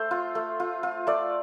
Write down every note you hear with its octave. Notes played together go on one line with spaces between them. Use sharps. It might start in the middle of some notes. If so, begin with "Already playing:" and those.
Already playing: A3 C5
F4
A3
F4
F4
A3 D5